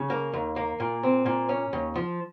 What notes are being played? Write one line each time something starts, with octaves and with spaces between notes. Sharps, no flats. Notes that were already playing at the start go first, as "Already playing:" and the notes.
Already playing: C#3
A#3
D#2
A#3
A#2
C4
A#2
C#4
D#2
F3